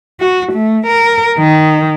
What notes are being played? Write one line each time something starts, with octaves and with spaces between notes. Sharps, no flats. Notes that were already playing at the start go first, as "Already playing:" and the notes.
F#4
A3
A#4
D#3